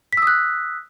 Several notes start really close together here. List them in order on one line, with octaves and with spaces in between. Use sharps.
B6 E6 D#6 F#6